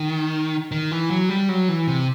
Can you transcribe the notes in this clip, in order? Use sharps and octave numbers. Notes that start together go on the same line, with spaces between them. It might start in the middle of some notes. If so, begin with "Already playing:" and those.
Already playing: D#3
D#3
E3
F#3
G3
F#3
E3
C3